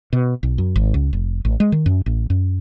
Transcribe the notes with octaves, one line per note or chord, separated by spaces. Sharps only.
B2
B1
F#2
G#1
C#2
F1
A1
G#3
D#3
F#2
A1
F#2